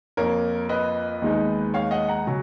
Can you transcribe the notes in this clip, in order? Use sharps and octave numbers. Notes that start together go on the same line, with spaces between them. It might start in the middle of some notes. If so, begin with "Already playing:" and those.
F2 F3 A#3 A#4 C#5
B4 D#5
D#2 D#3 G#3 B3 D#4
C#5 F5
D#5 F#5
F#5 A#5
C#3 F#3